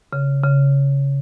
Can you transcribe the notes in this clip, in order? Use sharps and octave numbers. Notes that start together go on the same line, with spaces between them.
C#3
C#3